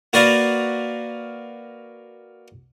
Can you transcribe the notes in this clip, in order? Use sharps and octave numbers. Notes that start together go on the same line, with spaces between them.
A#3 F#4 A#4 B4 D5 F5